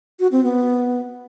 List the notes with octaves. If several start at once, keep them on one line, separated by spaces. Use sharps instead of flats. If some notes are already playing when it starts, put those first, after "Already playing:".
F#4
C4
B3